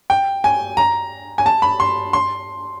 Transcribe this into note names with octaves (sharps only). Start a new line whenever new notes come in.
G5
G#5
A#5
G#5
A5
B5
C6
C6